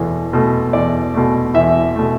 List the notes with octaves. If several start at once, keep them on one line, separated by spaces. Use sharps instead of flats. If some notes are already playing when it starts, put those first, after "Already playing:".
Already playing: E2 B2 A3
B2 A3
E2 D5
B2 A3
E2 E5
B2 A3